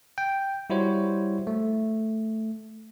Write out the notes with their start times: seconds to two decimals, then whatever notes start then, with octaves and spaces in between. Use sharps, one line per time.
0.18 G5
0.70 G3 E4 F#4 C5 C#5
1.47 A3